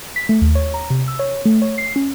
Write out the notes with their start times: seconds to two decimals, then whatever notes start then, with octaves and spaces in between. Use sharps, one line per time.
0.16 B6
0.29 A3
0.42 D#2
0.55 C#5
0.74 A#5
0.90 C3
1.08 E6
1.19 C#5
1.45 A3
1.62 C#5
1.78 C7
1.96 C#4